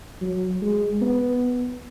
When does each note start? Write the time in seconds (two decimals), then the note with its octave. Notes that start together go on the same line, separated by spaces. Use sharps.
0.21 F#3
0.62 G#3
1.02 B3